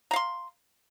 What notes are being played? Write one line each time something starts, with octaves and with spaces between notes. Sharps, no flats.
F5 A#5 C6